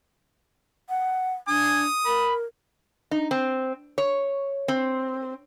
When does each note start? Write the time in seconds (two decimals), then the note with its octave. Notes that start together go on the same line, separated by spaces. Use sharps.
0.89 F#5
1.48 D4 G#5 D#6
2.05 A#4 B5
3.11 D#4
3.31 C4
3.98 C#5
4.68 C4